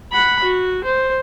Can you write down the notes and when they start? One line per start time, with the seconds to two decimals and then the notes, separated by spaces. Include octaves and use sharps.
0.12 F#5 B5
0.44 F#4
0.84 C5